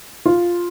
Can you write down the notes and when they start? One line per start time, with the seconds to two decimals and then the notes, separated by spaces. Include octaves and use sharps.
0.26 F4